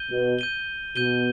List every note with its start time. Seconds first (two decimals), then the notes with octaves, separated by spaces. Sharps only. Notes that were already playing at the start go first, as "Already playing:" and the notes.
Already playing: G6 D#7 G7
0.10 B2
0.39 G6 D#7 G7
0.96 B2 G6 D#7 G7